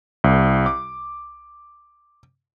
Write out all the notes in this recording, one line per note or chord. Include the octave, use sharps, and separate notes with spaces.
C2
D6